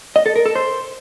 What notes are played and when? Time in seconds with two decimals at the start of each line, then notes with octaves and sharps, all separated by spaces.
0.16 D#5
0.26 A4
0.36 A#4
0.46 A4
0.55 C5